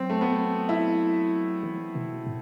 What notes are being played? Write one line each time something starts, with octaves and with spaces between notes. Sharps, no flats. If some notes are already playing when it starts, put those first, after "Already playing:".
Already playing: F#3 C4
A3
B3
E4
E3
B2
A2